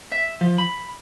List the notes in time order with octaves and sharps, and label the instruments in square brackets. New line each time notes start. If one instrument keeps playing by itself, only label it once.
[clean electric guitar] E5
F3
B5